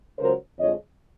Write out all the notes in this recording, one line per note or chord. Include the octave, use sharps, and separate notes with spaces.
C#2 C#3 F#3 A#4 C5
F2 D3 F3 G#3 C#5 D#5